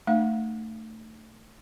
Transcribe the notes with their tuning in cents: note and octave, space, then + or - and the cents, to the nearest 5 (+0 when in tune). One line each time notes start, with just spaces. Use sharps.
A3 +15 D4 +45 F5 -35